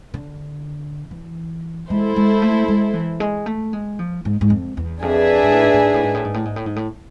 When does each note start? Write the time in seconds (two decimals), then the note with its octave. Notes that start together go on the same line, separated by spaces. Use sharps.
0.14 D3
1.11 E3
1.89 G#3 E4 A4 C5
2.16 G#3
2.42 A3
2.68 G#3
2.93 E3
3.20 G#3
3.46 A3
3.73 G#3
3.99 F3
4.25 G#2
4.41 G#2
4.50 F2
4.77 E2
5.02 F2 D4 G#4 B4 E5 G#5
5.43 G#2
5.52 A2
5.63 G#2
5.74 A2
5.84 G#2
5.94 A2
6.03 G#2
6.14 A2
6.24 G#2
6.34 A2
6.45 G#2
6.56 A2
6.66 G#2
6.76 A2